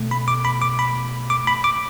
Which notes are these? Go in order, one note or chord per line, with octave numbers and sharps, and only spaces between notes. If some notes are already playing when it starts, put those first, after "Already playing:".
Already playing: B2 A3
B5
D6
B5
D6
B5
D6
B5
D6